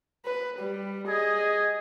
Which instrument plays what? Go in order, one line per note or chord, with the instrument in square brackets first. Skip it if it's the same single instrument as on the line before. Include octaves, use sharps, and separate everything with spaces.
[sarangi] B4
G3
[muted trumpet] G#4 [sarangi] D#5